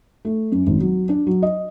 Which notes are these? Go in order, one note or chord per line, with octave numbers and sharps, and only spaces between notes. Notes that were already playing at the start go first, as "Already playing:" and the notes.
A3
F#2
G#1
F#3
D4
F#3
D#5